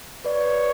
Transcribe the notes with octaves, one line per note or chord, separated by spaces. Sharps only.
B4 C#5 D5